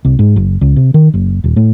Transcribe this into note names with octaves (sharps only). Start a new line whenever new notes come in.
C2
G#2
F#1
C#2
C3
D#3
F#1
D#1
A2